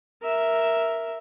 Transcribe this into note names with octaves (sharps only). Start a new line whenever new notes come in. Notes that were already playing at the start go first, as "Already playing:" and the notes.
A#4 E5